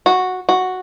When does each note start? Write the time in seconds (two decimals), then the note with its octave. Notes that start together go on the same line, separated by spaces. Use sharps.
0.06 F#4
0.49 F#4